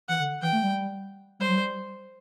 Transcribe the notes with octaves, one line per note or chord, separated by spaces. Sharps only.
E3 F#5
D3
E3 G5
A3
G3
G3 C5
F#3
G3